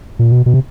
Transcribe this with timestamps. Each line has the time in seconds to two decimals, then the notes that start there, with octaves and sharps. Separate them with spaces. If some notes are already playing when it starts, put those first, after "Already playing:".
0.19 A#2
0.32 B2
0.46 B2
0.54 C3